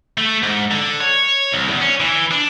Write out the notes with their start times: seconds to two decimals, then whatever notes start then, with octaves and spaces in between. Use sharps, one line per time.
0.18 A3
0.43 G#2
0.71 D3
1.01 C#5
1.52 C2
1.70 E2
1.81 C#4
2.00 E3
2.31 D4